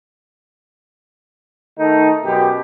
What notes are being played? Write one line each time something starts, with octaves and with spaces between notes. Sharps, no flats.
D#3 A3 D#4
F#2 B2 G4